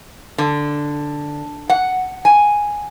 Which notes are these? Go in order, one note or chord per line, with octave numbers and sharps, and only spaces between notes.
D3
F#5
G#5